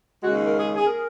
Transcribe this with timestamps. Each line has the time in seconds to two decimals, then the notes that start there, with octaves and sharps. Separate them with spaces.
0.21 D#2 C#3 G#3 F#4
0.45 A#4
0.58 G#4
0.75 G#4
0.84 A#4